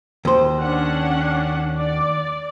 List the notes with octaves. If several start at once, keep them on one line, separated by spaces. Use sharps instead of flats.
D#2 C5
C#4 D4 F#5
D5